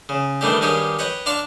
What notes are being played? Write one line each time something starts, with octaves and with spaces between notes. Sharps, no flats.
C#3
D#3 E3 G3 A3 D4 G4
G2 D#3 G4 G#4 C#5
B4 C#5 D#5 G5
D4 F5 A#5 C6 C#6